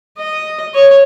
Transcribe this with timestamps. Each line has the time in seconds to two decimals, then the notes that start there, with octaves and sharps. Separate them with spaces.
0.18 D#5
0.74 C#5